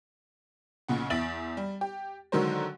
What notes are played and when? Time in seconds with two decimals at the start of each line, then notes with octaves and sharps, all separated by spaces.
0.88 B1 A#2 C#3 F#5
1.10 E2 E5 A6 D7 F#7
1.57 G3
1.81 G4
2.32 D3 D#3 F#3 G#3 A#4 C5